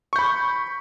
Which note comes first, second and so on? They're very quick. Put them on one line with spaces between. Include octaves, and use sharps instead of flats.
C#6 G6 B5